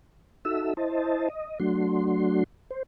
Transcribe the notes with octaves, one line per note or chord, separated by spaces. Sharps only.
D#4 F#4 A4 E5 E6
E4 C5 D#5 A5
D#5
F#3 A3 D4 F#4 C6
C5